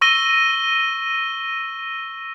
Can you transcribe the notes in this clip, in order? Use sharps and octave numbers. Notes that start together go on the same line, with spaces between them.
C#6 E6 A#6 D#7 G7